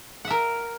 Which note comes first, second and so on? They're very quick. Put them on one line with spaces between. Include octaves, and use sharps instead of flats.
F#5 E5 A#4